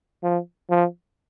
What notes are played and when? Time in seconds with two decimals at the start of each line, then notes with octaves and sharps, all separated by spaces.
0.23 F3
0.70 F3